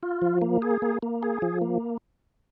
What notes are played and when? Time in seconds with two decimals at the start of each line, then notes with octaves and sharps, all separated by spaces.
0.03 F4
0.22 F3
0.42 A#3
0.62 G#4
0.82 A#3
1.02 A#3
1.23 G#4
1.42 F3
1.61 A#3